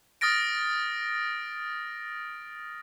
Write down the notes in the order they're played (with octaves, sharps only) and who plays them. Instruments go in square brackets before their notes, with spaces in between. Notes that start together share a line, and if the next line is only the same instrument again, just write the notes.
[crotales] D#6 F6 A6 A#6 D7